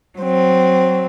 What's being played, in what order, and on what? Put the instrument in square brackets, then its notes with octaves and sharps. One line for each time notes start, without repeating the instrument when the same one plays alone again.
[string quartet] F#3 C4